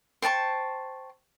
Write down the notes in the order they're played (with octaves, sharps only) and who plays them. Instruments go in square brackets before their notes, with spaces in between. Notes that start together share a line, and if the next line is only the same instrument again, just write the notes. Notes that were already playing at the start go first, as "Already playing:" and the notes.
[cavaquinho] C5 G5 A5 C#6